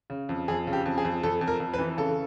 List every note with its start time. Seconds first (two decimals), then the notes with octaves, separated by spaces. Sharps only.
0.10 C#3
0.29 F2
0.48 F2 G#4
0.67 C#3
0.73 G4
0.86 F2
0.98 G#4
1.05 F2
1.23 F2 A4
1.41 F2
1.48 A#4
1.60 F2
1.74 B4
1.79 E3
1.97 C#3 A4